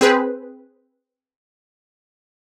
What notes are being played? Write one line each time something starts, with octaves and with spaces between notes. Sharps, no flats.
C4 G#4 B4